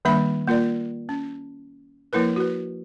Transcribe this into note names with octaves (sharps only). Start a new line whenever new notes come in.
D#3 G3 A#3 D4 E5 B5
A#3 F4 A#4 D5
C#4
F3 A#3 E4 A#4 B4
F#4 B4